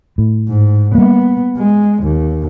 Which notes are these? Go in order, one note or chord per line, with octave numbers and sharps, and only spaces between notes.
A2
G#2
G3 A#3 B3
G#3
D#2